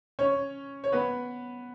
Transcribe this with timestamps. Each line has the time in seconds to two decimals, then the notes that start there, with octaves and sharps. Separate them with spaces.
0.19 C#4 C#5
0.84 C#5
0.92 B3 B4